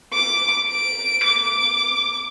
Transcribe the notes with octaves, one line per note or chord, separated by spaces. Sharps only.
D6
D7
D6